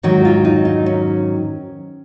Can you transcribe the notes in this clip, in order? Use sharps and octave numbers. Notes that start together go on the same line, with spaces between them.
G#2 D#3 F#3 F#4
F#4
F4
D#4
D#4
C#4